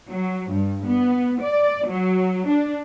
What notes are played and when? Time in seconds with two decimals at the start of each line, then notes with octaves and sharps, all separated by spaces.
0.10 F#3
0.52 G2
0.87 B3
1.42 D5
1.88 F#3
2.49 D4